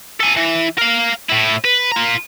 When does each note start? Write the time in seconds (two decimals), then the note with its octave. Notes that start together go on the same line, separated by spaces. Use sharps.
0.20 A4 G#5
0.37 E3
0.78 A#4 F5
1.30 A2 E4
1.65 B4
1.91 F4 A#5